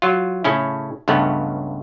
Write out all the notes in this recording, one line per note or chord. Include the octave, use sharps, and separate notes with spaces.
F#3 F4
A2 C#3 C#4 E4
C#2 G2 C#3 A3 B3 C#4